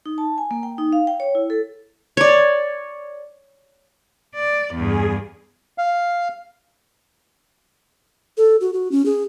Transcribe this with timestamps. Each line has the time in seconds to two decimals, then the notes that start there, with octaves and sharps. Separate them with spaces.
0.06 D#4
0.18 A5
0.38 G#5
0.51 A#3
0.63 G5
0.78 D#4
0.93 F5
1.07 G5
1.20 C#5
1.35 E4
1.50 A4
2.17 C#5 D5
4.35 D5
4.75 E2 G2 G#4
5.78 F5
8.37 A4
8.61 F#4
8.73 F#4
8.91 C#4
9.06 G#4